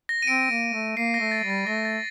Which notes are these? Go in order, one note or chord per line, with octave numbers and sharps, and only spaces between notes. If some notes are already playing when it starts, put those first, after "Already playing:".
A#6
D#7
C4 D7
A#3
A3
A#3 C7
A#6
A3
A6
G3
A6
A3 A#6
A6